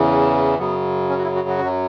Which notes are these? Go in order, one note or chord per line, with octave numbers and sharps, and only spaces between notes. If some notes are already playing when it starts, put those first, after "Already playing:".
Already playing: E2 C#3 E3
F#2 C#3 F#3 B3
C#4
F#4
E4
F#4
F#4
F#2 F#3